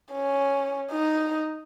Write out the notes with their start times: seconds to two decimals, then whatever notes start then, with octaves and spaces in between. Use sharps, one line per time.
0.12 C#4
0.92 D#4